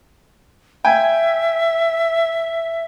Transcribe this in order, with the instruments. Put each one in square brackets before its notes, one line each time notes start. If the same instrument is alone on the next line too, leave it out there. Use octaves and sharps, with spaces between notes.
[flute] E5 [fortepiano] G5 G#5